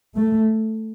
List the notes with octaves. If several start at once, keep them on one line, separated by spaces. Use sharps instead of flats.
A3